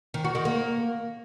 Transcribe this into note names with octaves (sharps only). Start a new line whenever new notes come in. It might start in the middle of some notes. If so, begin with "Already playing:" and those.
D#3
F#4
D#3
A#3